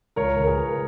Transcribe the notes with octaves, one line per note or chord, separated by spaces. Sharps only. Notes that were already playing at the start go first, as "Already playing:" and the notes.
C#2 A#4 C#5
C#2
A#4
G#4 B4
C#2